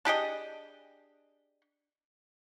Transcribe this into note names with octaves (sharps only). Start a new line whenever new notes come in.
D4 G4 G#4 D#5